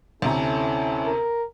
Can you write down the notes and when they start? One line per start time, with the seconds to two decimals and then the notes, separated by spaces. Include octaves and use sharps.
0.22 D2 C3 C#4 E4 A4 A#5
1.05 A#4